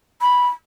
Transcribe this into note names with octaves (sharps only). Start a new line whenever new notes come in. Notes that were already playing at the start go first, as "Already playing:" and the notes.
B5